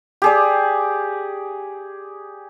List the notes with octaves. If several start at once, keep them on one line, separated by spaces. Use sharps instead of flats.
G4 G#4 D5